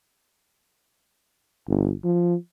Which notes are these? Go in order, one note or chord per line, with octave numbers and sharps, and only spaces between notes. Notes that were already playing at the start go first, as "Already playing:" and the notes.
G1
F3